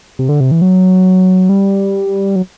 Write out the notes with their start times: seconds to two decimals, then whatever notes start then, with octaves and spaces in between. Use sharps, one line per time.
0.19 C3
0.29 D3
0.40 C3
0.51 E3
0.62 F#3
1.49 G3
2.36 F#3